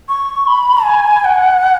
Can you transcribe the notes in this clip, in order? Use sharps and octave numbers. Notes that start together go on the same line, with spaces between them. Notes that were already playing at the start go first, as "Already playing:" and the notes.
C#6
B5
G#5
F#5